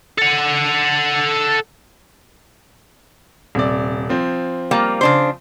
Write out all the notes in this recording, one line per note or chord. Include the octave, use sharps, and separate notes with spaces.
A4 F#5
D#1 C3 D5
F3 C4
G3 A#3 F4
C#3 D4 C5